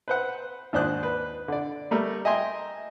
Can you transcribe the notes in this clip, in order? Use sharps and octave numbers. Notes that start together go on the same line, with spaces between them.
B4 C5 F#5
D#2 G#2 D4 C5 D#6 F#6
B4
D3 D5
G3 A3 A#4
D#5 E5 G5 G#5 A#5 C6